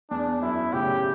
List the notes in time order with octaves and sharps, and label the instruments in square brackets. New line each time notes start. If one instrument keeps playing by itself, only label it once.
[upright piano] E2 [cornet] D4
[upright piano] F#2 [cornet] E4
[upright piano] A2 C#3 [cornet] G4